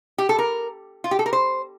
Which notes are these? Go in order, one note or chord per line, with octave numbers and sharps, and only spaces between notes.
G4
A4
A#4
F4
G4
A4
A#4
C5